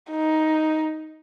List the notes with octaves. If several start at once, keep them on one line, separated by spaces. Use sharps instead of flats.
D#4